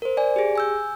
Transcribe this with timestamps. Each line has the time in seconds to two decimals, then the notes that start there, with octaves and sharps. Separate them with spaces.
0.02 A#4 C5
0.17 D5 G#5
0.36 G4 G#4
0.56 G#5 E6 G6